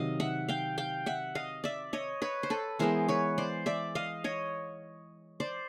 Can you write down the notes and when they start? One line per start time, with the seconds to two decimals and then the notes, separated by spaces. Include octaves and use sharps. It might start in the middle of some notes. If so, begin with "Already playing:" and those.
Already playing: C3 D#3 F#3 D#5 F5
0.20 E5 F#5
0.48 F5 G5
0.78 F5 G5
1.06 E5 F#5
1.35 D#5 F5
1.64 D5 E5
1.93 C#5 D#5
2.22 B4 C#5
2.43 C5
2.50 A4 B4
2.79 E3 G#3 B3 A#4 C5
3.08 B4 C#5
3.38 C5 D5
3.66 D5 E5
3.95 D#5 F5
4.24 C#5 D#5
5.40 C5 D5